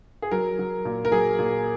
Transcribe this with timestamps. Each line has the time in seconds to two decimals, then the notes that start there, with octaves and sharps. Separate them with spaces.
0.22 G#4
0.31 F#3 A#4
0.59 F#3
0.85 A#2
1.05 A#4
1.11 F#3 G#4
1.39 A#2